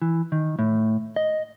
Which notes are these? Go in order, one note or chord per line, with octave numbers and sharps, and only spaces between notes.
E3
D#3
A2
D#5